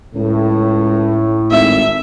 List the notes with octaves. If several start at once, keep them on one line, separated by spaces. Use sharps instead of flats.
C#2 A2
G#1 E5